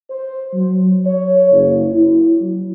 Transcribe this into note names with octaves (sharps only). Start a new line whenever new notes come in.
C5
F#3
C#5
F#1
E4
F#3